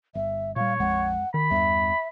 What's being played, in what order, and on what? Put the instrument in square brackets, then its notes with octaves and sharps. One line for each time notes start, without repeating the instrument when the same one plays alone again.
[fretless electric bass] G1 [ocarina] E5
[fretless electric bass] A#2 G3 [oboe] C#5 [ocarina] F5
[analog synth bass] A#1 [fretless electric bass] F2 G#3 [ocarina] F#5
[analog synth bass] D#3 [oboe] B5
[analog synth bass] E2 [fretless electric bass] G2 [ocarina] E5